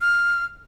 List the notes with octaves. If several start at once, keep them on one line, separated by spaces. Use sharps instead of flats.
F6